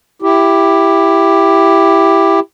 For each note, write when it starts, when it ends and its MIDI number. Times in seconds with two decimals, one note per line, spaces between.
0.22 2.40 64
0.22 2.40 67